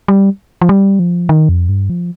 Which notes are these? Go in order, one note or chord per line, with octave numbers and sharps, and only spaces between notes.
G3
F3
G3
F3
D#3
F2
G2
F3